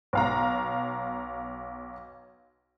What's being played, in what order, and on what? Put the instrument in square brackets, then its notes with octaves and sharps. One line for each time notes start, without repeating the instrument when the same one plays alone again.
[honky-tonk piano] B1 F5 A#5